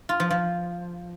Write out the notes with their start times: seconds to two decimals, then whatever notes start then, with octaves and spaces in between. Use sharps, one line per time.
0.09 F4
0.20 F3
0.30 F3